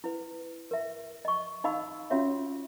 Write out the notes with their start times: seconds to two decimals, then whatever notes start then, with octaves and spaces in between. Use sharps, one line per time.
0.04 E4 B4
0.71 A#4 E5
1.25 D#5 C#6
1.64 D#4 D#5 F5 B5 E6
2.10 C#4 F4 F#4 C#5 E5 F5